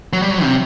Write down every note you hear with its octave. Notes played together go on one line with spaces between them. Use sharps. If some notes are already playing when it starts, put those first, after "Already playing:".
F#3
G3
F#3
C3